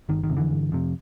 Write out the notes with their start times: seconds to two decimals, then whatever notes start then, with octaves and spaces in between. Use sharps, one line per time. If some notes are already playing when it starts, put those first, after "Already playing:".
0.09 G1 D#3
0.23 D#3
0.30 F2 C3
0.37 D3 E3
0.51 G1
0.72 F2 C3